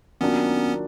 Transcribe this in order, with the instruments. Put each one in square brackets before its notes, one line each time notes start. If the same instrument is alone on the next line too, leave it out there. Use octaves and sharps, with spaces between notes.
[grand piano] D#3 F#3 A#3 D4 F4 [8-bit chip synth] B3 C#4